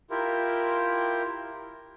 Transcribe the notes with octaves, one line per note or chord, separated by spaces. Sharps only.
E4 F4 G4 A#4